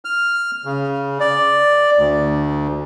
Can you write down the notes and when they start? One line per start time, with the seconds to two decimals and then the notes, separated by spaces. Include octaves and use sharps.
0.05 F6
0.65 C#3
1.20 D5
1.98 D2